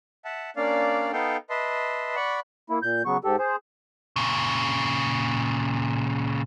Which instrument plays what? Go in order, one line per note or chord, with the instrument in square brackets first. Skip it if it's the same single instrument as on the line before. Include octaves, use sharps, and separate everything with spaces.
[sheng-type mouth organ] E5 F#5 A5
A#3 C#4 D4 D5 F5
B3 D#4 A4 F5 G5
B4 D#5 E5 A5 C6
D5 F#5 B5 C#6
[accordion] A#3 E4
A#2 G6
C#3 F#3 B3 C#6
G#2 G4 A4
G#4 C5
[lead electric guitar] A#2 C#3